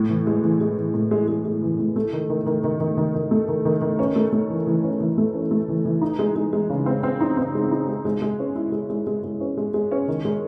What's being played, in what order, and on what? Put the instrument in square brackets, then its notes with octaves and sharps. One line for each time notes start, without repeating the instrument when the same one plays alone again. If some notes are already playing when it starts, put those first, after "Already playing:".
Already playing: [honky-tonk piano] A2
E3
G#3
E3
G#3
E3
A2
G#3
G#3
G#3
E3
A2
A3
D#3
D#3
D#3
D#3
D#3
D#3
D#3
A3
D#3
D#3
D#3
C#4
A3
A3
E3
E3
C#4
E3
A3
C#4
A3
E3
E3
D#4
G#3
G#3
G#3
C#3
C4
C4
D#4
C4
G#3
D#4
G#3
G#3
G#3
C#4
E4
G#3
G#3
G#3
G#3
C#4
G#3
G#3
C#4
D#3
G#3